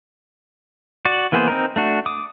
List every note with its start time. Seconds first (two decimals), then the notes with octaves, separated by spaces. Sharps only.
1.05 F#4 D5
1.32 E3 A#3 B3 G#4 C5
1.48 C4 D#4 A#4
1.76 A3 D4 F#4
2.06 D6 D#6